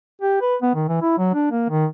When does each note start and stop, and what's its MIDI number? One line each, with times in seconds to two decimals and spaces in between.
0.22 0.41 67
0.41 0.56 71
0.62 0.72 59
0.75 0.88 51
0.88 0.98 52
1.02 1.16 64
1.18 1.33 54
1.34 1.51 62
1.51 1.68 58
1.69 1.86 51